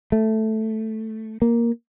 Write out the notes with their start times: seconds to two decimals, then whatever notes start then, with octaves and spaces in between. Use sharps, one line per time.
0.12 A3
1.42 A#3